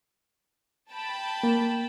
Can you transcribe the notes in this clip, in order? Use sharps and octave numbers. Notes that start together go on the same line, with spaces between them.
G5 A5 B5
A#3